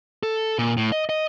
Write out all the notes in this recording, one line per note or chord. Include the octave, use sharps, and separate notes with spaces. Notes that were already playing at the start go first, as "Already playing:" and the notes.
A4
A#2
A2
D#5
D#5